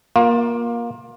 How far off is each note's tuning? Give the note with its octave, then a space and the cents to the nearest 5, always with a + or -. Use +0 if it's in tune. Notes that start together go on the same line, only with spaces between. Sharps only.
A#3 +20 F4 +25